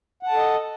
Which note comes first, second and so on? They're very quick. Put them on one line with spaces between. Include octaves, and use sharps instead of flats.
F#5 A5 A4 D#5